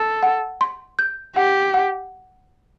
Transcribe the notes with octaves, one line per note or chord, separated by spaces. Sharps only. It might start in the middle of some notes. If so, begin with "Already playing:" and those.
Already playing: A4
F#5
C6
G6
G4 F#5
F#5